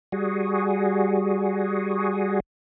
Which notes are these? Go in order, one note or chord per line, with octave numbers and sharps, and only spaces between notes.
G3 F#4 G#4